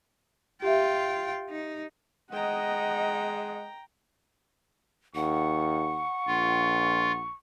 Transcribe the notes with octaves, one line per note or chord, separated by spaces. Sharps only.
F4 G4 E5 G5
D#4
G#3 D#5 F#5 G5 A#5
D#2 F#5 C#6
A#1 F4